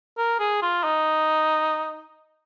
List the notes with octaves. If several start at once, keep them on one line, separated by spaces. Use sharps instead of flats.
A#4
G#4
F4
D#4